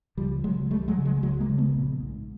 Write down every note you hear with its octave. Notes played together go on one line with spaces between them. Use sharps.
C#2 F3 G3
C#3 F#3 G#3
C#2 G3 A3
F#3 G#3
C#3
F#3 G#3
C#2 F#3 G#3
G#3 A#3
C#3
A3 B3
A#1
G#2